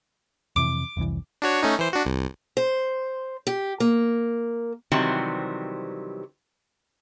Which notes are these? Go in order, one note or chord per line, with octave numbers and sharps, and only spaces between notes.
F2 C3 E3 D6
F1 C2 E3
D4 F#4 C#5
A3 C#4 D#4
E3 C5
D4 F#4
C2
C5
G4
A#3
C3 D#3 E3 F#3 G3 C4